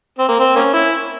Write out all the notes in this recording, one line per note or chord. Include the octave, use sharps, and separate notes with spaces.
C4
A#3
C4
A#3 C#4
E4